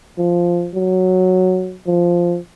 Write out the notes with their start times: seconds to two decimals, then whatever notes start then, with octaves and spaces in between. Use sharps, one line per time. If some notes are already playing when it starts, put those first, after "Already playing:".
0.18 F3
0.75 F#3
1.87 F3